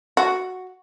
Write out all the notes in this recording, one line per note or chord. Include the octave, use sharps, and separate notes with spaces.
F#4